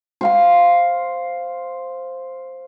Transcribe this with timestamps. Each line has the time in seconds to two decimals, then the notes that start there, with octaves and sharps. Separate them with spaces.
0.21 C5 F5 C6